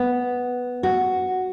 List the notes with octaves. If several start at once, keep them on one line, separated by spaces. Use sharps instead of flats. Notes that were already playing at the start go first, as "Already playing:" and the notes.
Already playing: B3
F#4